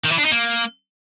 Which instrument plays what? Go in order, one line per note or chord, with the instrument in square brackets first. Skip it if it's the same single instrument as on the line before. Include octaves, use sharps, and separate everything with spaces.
[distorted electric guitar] D#3
E3
D4
D#4
A#3